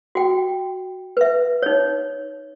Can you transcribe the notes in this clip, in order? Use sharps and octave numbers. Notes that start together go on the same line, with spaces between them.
F#4 G5
B4 E5
D#4 C#5